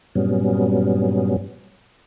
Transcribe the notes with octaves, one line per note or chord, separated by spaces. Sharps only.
G2 A#2 F#3 G3 B3 C#4